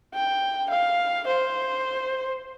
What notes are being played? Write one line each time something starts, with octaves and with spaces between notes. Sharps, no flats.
G5
F5
C5